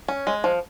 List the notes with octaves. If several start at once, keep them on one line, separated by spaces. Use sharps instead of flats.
C#4
G#3
F3